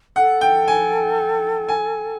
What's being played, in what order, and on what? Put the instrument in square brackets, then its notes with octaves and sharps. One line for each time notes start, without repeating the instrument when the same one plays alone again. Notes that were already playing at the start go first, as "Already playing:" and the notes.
[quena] A4 [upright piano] F#5
[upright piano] G5
G#5
G#5